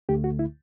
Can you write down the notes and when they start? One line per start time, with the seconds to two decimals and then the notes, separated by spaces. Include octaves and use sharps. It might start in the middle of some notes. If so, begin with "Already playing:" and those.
0.09 D2 D3 A3 G4
0.24 F#4
0.39 E4